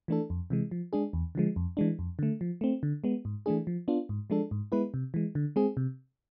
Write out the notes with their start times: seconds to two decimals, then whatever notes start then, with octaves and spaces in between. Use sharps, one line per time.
0.08 E3 A3 D4 A4
0.30 F2
0.50 C3 E3 G#3
0.71 F3
0.93 G#3 D4 G#4
1.13 E2
1.35 D3 F3 G#3
1.56 F2
1.77 E3 G#3 D4
1.99 F2
2.19 D3 A3
2.41 F3
2.61 A3 C4
2.83 D3
3.04 G#3 B3
3.25 G#2
3.46 E3 A3 D4 G#4
3.67 F3
3.88 B3 D4 F4
4.09 G#2
4.30 F3 G#3 D4 A4
4.51 G#2
4.72 G#3 B3 E4 B4
4.94 C3
5.14 E3 G#3
5.35 D3
5.56 G#3 C4 G#4
5.77 C3